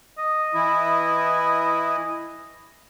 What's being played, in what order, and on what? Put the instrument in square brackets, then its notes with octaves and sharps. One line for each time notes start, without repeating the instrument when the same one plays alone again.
[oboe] D#5
[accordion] E3 E4